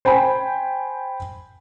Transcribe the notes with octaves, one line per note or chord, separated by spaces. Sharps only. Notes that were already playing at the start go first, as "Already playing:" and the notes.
C5 G5 G#5 B5